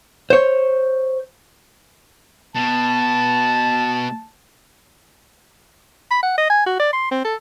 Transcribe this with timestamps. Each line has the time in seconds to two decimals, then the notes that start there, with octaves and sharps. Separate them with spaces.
0.30 C5 C#5
2.55 B2 A5
6.11 B5
6.23 F#5
6.38 D#5
6.49 G#5
6.66 F#4
6.80 D5
6.93 C6
7.11 C4
7.24 A4